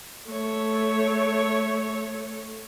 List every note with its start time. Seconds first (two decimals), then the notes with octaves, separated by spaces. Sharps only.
0.29 A3 C#5